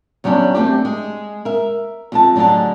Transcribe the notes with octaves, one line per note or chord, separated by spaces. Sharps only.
E2 F#3 G3 C#4 D4
A3 C4 D4 G4
G#3
A#4 E5
F2 G#3 A5
A2 D3 F#3 G#3 A5